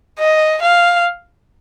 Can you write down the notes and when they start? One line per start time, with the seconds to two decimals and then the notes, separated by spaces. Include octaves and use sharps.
0.19 D#5
0.62 F5